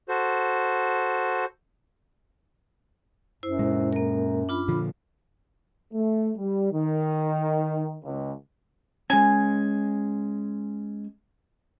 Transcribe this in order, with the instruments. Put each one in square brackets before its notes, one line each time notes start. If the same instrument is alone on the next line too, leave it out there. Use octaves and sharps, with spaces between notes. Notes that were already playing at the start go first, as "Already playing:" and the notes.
[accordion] F#4 A4 C5
[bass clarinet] F#2 [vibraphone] E4 C5
[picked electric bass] A#2 G#3
[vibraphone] A#3 A#4
D4 F4 B5
[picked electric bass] A#2 D3 F3
[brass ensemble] A3
G3
D#3
C#2
[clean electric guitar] G#3 C#4 [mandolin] G#5